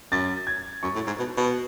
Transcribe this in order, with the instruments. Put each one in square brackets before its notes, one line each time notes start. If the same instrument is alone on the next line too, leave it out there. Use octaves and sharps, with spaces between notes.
[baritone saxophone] F#2 [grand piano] A6
[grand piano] G#6
[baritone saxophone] F#2 [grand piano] C#6
[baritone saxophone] A2
G#2
B2
B2